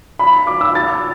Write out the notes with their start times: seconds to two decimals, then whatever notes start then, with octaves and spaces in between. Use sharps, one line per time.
0.19 B5
0.47 D6
0.61 E6
0.75 A6